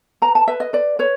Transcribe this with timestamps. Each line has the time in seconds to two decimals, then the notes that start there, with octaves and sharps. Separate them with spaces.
0.22 B4 A#5
0.35 A5
0.48 B4 E5
0.60 D#5
0.73 B4 D5
0.99 B4 C#5